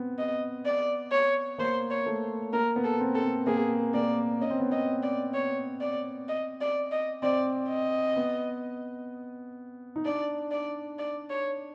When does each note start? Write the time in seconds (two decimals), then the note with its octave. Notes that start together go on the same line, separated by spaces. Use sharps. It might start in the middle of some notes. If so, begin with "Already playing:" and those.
Already playing: B3 C4
0.18 D#5
0.65 D5
1.12 C#5
1.58 A#3 C5
1.90 C#5
2.06 A3
2.53 A#3 A#4
2.76 B3
2.84 A4
3.00 C4
3.15 A4
3.23 B3
3.47 A#3 G#4
3.94 A#3 D5
4.41 C#4 D#5
4.50 C4
4.60 B3
4.70 C4 D#5
5.03 D5
5.34 C#5
5.81 D5
6.29 D#5
6.61 D5
6.92 D#5
7.22 C4 D5
7.69 D#5
8.16 B3
9.96 D#4
10.05 D4 D5
10.51 D5
10.99 D5
11.30 C#5